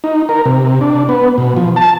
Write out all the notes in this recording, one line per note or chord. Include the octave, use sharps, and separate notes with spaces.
D#4
A#4
C3
D4
B3
B2
F3
A5